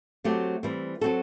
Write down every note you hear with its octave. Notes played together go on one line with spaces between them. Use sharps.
F#3 A3 C4 G4
E3 G3 C4
F#3 C4 F#4 A4